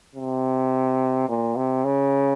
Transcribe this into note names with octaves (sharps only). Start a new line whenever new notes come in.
C3
A#2
C3
C#3